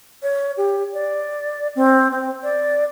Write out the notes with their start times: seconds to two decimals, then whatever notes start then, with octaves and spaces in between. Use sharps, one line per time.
0.23 C#5
0.57 G4
0.93 D5
1.76 C4
2.11 C4
2.43 D5